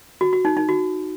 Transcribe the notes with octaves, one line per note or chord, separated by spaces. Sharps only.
F#4
F#4
D#4
D#4
F#4